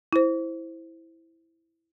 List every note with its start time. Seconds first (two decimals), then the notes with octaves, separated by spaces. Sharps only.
0.13 E4 C5